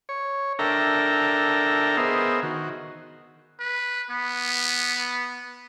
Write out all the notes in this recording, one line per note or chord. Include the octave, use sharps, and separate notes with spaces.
C#5
D4 A4 A#4 E5 G5 A#5
B3 G#4 A#4 C5 D#5 E5
D#3 F#4
B4
B3